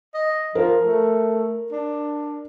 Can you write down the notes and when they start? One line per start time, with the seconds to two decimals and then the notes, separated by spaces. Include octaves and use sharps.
0.14 D#5
0.55 F3 A#4
0.84 A3
1.72 D4